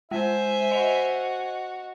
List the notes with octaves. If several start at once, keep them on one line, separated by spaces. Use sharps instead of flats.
G#3 C5 E5 G#5
F#4 D#5 F7